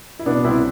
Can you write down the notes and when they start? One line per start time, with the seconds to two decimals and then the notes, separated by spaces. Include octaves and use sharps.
0.19 E4
0.26 B2 B3 D4
0.44 C2 C4 E4